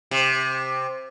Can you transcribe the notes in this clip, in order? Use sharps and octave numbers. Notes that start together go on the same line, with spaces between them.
C3